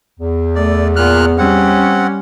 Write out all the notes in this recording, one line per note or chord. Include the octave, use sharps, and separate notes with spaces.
E2
A3 D5
A#2 B3 F6 F#6
G3 C4 C#4 F#5